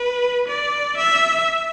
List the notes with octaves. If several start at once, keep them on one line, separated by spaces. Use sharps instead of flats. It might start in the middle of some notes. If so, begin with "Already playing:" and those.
Already playing: B4
D5
E5